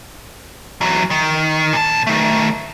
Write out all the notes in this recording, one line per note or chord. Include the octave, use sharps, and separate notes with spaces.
E3 F#3
D#3
A#2 A5
D#3 A3